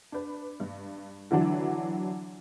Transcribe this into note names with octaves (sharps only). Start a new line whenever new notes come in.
D4 B4
G2
D3 E3 F#3 D4